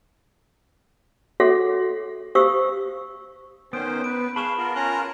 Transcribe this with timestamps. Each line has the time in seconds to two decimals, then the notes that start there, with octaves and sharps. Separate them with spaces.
1.40 F#4 G#4 A4 C#5 E5 F#5
2.35 G4 C5 F5 C#6 D#6 E6
3.73 D#3 B3 C#4 C5 D#6 D7
4.04 B4 D7
4.36 G#4 F5 A5 B5 C#6 E7
4.58 B3 F4 A#4
4.76 C#4 A#5 C6 F#6